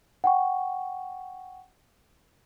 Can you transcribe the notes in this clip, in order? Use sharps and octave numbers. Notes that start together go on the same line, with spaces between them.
F#5 G5 C#6